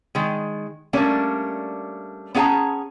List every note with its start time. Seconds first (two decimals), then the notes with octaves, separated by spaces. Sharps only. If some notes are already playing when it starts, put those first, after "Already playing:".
0.15 D#3 G#3
0.93 G3 A3 A#3 C#4 D4
2.35 B3 C#4 G#4 F5 A5 A#5